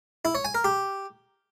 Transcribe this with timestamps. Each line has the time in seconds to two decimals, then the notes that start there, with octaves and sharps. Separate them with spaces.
0.25 E4
0.35 C#5
0.45 G#5
0.55 A#4
0.64 G4